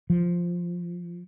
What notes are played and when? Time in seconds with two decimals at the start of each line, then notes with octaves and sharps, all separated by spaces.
0.10 F3